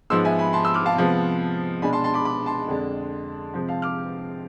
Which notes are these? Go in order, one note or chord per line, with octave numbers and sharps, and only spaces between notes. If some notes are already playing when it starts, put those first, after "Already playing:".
G#2 F3 G#3 B3 C6 E6
E5 G#5
G#5 B5
A5 C6
C6 E6
D6 F6
F5 A5
C3 F3 G#3 B3
B2 G#3 D4 G#5 B5
A5 C6
A5 C6
B5 D6
B5 D6
A5 C6
F2 D3 G#3 D4
C3 F3 G#3 C4
F5 A5
D6 F6